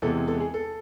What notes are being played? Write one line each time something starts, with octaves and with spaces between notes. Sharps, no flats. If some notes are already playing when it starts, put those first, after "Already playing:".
E2 C3 E3 G#3 A4
A4
G#4
A4